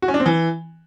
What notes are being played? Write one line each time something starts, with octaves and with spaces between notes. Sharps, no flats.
F#4
C#4
D4
C4
E3